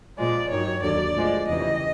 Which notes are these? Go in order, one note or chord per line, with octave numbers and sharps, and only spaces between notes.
A#2 F3 G#3 D5
G2 D#3 F#3 C#5
D#2 D3 F#3 D5
A2 F3 G#3
E2 C#3 E3 G3 D#5